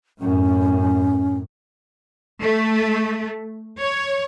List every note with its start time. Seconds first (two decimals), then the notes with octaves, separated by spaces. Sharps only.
0.21 F#2 A2 C#4
2.41 A3
3.78 C#5